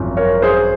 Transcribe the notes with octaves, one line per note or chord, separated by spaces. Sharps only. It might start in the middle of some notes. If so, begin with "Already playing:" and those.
Already playing: G#1 F#2 F3
A#4 C#5
G#4 C5